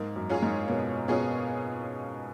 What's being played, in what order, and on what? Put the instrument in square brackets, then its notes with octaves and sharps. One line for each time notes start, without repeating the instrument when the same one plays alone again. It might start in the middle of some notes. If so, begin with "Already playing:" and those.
Already playing: [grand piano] G#2 [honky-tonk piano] A#3
[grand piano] F#2
[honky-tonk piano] C#4 F4 G#4 C#5
[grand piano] G#2
[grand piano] B2 [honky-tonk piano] A#3
[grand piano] B2 [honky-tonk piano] C#4 F4 G#4 C#5